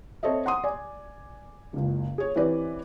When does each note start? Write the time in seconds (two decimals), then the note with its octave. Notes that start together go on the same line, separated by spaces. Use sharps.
0.23 C4 A4 C#5 D#5 E5
0.46 F#5 C6 D#6
0.64 D5 G#5
1.73 F#1 C#2
2.18 G#4 C#5
2.36 E3 C4 C#4 G4 B4 D5